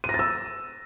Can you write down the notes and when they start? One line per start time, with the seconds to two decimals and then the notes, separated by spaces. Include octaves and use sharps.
0.04 D#7
0.09 A#6
0.14 A6
0.19 E6